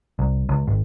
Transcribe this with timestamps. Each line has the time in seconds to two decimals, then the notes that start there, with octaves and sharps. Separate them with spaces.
0.19 C2
0.49 C#2
0.67 G#1